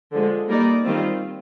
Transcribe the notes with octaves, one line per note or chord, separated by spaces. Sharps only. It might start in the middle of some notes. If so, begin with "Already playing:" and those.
D3 F3 G#3
G3 A#3 D#4 A#4 D5
D#3 G3 C4 F4